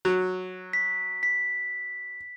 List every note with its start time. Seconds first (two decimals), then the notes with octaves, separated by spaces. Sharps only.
0.05 F#3
0.73 B6
1.23 B6